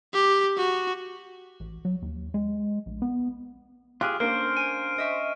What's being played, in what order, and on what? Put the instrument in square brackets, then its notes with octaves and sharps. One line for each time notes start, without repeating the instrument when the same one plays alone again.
[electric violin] G4
F#4
[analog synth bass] A1
F#3
D#2
G#3
A#1
B3
[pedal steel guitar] F4 G4 G#4 [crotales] F6 [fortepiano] F#6
[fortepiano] A#3 [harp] C#4 D4 [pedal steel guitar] C5 [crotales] F6 C7 D7
[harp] G#5 [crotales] D7 D#7
[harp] D#5 E5 C#6